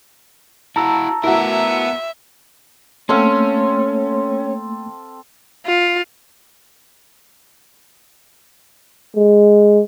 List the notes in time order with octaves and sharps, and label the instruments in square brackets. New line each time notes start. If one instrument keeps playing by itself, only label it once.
[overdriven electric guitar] E4 F#4 [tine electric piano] A5 A#5 E6
[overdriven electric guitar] B3 A#4 [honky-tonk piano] E4 F#4 [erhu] E5
[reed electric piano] A3 A#3 [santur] C4 A4 F5 [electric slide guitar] C#4
[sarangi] F4
[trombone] G#3